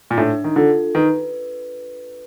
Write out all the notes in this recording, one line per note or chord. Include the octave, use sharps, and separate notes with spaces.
A#2
A2 D4
D#3
D3 F4 A4
D#3 B4